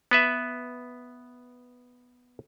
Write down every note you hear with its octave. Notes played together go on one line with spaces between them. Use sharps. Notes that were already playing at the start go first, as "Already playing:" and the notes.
B3 B4 E5